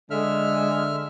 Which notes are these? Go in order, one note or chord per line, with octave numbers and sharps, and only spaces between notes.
D3 G#3 E5 F6